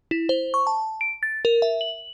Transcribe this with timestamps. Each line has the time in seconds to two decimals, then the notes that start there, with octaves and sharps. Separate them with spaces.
0.11 E4
0.29 C5
0.54 C#6
0.67 A5
1.01 D7
1.23 A6
1.45 A#4
1.62 E5
1.81 F#7